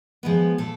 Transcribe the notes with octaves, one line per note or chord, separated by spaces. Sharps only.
F3 G#3 B3 B4
A#2 A4